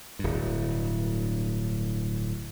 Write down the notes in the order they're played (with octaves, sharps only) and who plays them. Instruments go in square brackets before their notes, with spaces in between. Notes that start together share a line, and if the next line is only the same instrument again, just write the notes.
[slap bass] D1 G2